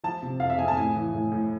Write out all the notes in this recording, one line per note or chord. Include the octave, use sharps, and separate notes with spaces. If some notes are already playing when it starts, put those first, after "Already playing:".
F3 A5
C3
F2 F5
E5
F2 G#5
A5
A2 G#5
E3
A2
A2